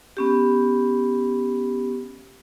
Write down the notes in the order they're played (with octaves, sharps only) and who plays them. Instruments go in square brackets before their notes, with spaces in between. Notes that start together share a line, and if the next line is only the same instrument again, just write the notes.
[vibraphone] B3 C#4 G4